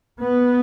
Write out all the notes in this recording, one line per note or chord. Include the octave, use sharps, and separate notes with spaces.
B3